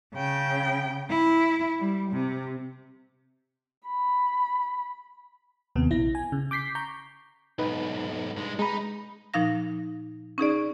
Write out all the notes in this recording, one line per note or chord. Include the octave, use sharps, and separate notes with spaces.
C#3 G5
E4
G3
C3
B5
D#2 C3 B3
A#1 E4 A#6
G#5
C#3
D6 G6 B6 C7
A#5 C#6 G6
B1 G#2 D#4 B4
G2 G#3
G#3 D#4 B5
A#2 F3 D#4 F5 A#6
C#4 D#4 G#4 D5